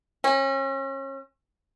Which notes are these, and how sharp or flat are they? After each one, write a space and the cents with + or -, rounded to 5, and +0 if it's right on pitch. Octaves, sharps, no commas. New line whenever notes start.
C#4 -35